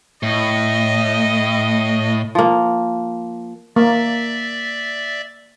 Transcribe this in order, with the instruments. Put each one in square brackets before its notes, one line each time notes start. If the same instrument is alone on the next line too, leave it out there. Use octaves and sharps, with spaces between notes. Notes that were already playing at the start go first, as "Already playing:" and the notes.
[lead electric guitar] A2 [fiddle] D#5
[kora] F3 A#3
[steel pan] A#3 [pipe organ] D5 E5